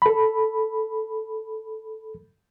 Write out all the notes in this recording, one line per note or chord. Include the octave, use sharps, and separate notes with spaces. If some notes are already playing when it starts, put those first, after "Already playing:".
A4 B5